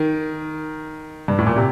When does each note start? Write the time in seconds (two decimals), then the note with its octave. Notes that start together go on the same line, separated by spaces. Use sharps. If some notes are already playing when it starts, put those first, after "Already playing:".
Already playing: D#3
1.28 G2
1.38 A2
1.47 A#2
1.56 C3